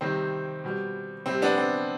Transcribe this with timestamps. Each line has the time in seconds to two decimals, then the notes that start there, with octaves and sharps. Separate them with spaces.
0.01 C3 D#3 G3 C4
0.64 B2 G3
1.26 C3 G3 C4
1.42 B3 D4
1.58 C4